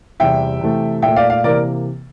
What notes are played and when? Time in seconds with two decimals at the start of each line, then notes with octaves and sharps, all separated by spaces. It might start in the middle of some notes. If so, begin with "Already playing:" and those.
0.20 E2 C3 G3 E5 G5
0.61 C3 E3 A3
1.02 A#2 A3 E5 G5
1.16 D5 F5
1.30 D5 F5
1.44 C3 E3 A#3 A#4 D5